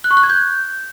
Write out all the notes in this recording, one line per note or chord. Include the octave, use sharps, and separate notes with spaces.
F#6
C#6
F#6
G#6
G6